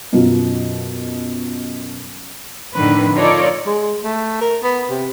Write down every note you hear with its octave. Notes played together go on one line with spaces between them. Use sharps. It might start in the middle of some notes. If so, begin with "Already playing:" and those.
F#2 B2 F#3 F4
F2 A2 D3 D#3 B4
D#4 F4 A4 A#4 C#5 D5
G#3
A3
A#4
B3
C3